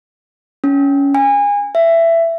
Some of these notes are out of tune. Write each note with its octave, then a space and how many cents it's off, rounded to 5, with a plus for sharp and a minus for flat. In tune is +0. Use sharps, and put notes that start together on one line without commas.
C#4 +15
G#5 -30
E5 +15